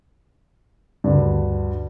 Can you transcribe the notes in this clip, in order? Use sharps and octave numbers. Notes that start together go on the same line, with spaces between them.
D2 G2